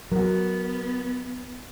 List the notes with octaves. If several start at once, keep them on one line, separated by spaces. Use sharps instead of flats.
F#3 B3 F#4 A#4